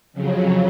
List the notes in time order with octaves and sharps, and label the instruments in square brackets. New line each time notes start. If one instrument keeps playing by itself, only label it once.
[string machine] F2 C#3 F#3